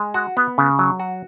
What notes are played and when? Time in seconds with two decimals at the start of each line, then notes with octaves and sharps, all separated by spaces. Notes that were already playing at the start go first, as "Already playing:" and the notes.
Already playing: G#3
0.14 F#4
0.37 B3
0.58 C#3
0.79 F#3
1.00 F#4